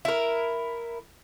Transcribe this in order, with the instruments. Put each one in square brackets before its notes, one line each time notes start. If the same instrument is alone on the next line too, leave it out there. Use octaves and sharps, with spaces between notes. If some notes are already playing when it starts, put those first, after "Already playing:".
[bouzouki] E4 A#4